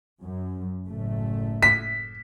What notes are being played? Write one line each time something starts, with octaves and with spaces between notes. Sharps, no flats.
F#2
F#1 A2 A3
B6